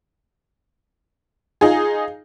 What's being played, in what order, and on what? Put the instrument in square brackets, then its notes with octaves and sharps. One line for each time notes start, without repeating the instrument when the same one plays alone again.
[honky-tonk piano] D#4 F4 G#4